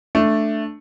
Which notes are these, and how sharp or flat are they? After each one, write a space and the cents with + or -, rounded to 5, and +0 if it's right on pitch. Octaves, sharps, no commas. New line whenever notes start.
A3 +0 D4 +0